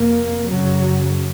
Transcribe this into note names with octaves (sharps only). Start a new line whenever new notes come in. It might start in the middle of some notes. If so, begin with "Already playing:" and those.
Already playing: F2 C3 A#3
F#2 C#3 F#3